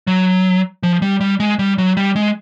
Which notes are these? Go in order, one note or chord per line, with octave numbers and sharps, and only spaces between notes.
F#3
F3
G3
G3
G#3
G3
F#3
G3
G#3